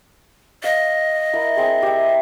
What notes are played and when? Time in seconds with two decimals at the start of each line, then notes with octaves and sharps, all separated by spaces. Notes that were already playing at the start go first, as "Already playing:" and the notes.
0.64 D#5 F5
1.33 E4 A#4
1.57 C4 G#4
1.83 G4 E5